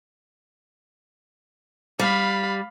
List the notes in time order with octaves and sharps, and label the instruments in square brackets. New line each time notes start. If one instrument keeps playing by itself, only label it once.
[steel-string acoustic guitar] G3 [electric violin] F5 B5